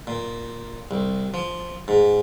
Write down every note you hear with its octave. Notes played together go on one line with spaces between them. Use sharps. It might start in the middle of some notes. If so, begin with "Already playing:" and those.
A#2
C2
F3
G#2